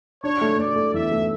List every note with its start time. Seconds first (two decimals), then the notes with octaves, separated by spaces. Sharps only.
0.24 D4 C#5
0.41 A3
0.58 A3 D5
0.76 A3
0.94 E2 E5
1.12 A3